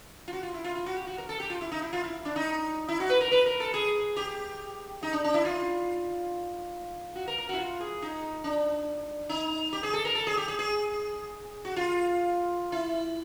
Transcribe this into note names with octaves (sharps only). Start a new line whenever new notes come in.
F4
F#4
F4
E4
F4
F4
F#4
G4
F#4
A#4
A4
G4
F4
E4
D#4
E4
F4
E4
D4
D#4
E4
F#4
B4
A#4
B4
A#4
A4
G#4
G4
D#4
D4
D4
E4
F4
F#4
A#4
A#4
E4 F#4
F4
G#4
D#4
D4
D#4
G4
G#4
A4
A#4
A4
G#4
G4
G#4
G#4
F#4
F4
E4